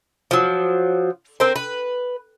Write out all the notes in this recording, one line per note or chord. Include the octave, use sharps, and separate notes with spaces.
F3 F#3
C4 A#4 C5
B4